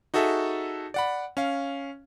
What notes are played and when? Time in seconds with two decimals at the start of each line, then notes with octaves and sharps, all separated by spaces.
0.14 D#4 F#4 G#4 A4 E5
0.94 D5 F#5 B5
1.37 C#4 F5